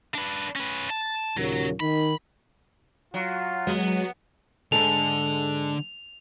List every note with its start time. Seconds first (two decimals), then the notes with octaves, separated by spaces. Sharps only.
0.14 D4 B4
0.56 C#4 B4
0.90 A5
1.37 D#2 A#2 C#3 F#3
1.80 D#3 D#4 B5
3.14 F#3 F4
3.67 F#3 G#3 B3
4.72 G#2 D3 G#3 A4 F7